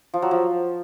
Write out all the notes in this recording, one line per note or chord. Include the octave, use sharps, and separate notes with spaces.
F3
F#3
F3